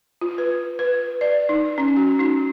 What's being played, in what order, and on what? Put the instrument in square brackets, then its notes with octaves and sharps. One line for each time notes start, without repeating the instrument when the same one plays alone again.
[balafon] F4
B4
B4
D5
D#4
C#4
F#4
D#4